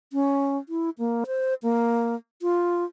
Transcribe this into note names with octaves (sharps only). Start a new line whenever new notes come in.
C#4
E4
A#3
C5
A#3
F4